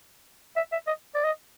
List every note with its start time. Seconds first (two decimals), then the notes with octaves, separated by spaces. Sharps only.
0.57 E5
0.72 E5
0.87 D#5
1.15 D5
1.24 D#5